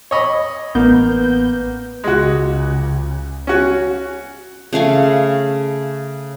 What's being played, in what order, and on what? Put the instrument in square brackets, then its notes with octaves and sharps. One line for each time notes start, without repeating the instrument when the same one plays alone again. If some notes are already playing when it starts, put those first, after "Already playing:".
[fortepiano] C#5 D#5 B5
[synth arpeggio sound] A1 B3 G6 [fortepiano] A#3
[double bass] C#2 C#3 [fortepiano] G#3 F#4
[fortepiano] C#4 F#4
[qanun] C#3 A3 F5 G#5